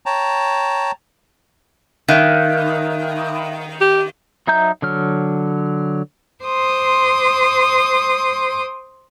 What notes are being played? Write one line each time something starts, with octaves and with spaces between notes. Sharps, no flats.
C#5 G5 A5 A#5
D#3 E5 F5 F#6
G4
F#3 D#4 E5 A#5 G6
D3 F#3 F6
C5 C6 D6 D#6